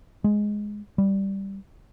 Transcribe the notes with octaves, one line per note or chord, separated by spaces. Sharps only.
G#3
G3